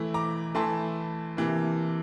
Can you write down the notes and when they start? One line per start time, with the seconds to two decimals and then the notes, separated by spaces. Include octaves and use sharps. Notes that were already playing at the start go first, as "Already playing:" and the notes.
Already playing: E3 A3 E4
0.14 A#5 D6
0.55 E3 A3 E4 A5 C6
1.37 C3 E3 A#3